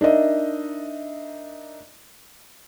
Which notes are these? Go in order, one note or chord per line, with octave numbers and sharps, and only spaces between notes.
D4 D#4 A#4 D#5 E5